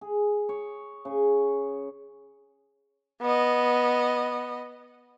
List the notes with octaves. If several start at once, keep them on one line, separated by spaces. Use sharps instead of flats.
G#4
C#5
C#3
B3 D#5